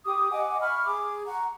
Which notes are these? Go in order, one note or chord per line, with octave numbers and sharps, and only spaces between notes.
G4 D6 D#6
D#5 F#5 G#5 D6
E5 B5 C#6 F6
G#4 D6
F#5 A#5 C#6